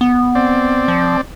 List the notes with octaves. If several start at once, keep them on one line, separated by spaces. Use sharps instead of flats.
B3
C4 D5
F3